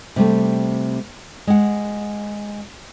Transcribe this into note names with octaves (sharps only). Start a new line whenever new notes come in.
C3 G3 A3
G#3 F#5